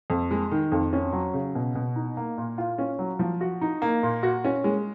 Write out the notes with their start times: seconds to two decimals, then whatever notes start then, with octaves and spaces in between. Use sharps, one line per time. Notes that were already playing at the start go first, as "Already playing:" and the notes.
0.10 F2
0.31 G#3
0.51 D#3
0.72 F2
0.93 C#4
1.13 F#3
1.34 C#3
1.55 B2
1.75 B2
1.96 D#4
2.17 A#3
2.38 A#2
2.58 F4
2.78 C#4
2.99 F#3
3.19 F3
3.41 F#4
3.61 D#4
3.82 A#3
4.03 A#2
4.23 F#4
4.45 C#4
4.64 G#3